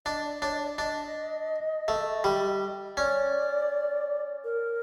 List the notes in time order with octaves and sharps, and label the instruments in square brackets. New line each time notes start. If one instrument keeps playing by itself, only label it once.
[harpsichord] D4 [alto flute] D#5
[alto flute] D5
[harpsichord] D4 [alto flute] C#5
[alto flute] D#5
D5
[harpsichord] D4 [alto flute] D#5
[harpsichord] A3
G3
[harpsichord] C#4 [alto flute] D5
[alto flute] A#4